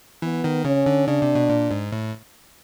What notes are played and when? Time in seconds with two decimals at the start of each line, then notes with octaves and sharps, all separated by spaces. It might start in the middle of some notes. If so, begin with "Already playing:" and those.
0.22 E3 B3
0.44 D#3
0.65 C#3 C#4
0.86 D3
1.07 C#3 D4
1.22 C3
1.35 B2
1.49 A#2
1.71 G#2
1.92 A2